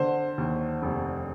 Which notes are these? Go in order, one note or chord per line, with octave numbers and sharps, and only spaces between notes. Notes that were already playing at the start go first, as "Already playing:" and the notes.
Already playing: D3 C5
D#2
F1